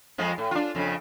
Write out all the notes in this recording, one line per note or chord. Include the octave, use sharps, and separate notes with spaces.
F2 F3 G#3
A2
D4 F4
F2 C#3